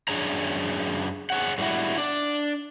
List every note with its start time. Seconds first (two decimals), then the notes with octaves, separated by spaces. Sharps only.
0.08 F#2 E3 D4 G#4 C#5 A#5
1.30 G#4 C#5 F#5
1.58 A2 G3 B3 E4 F#4
1.98 D4 D5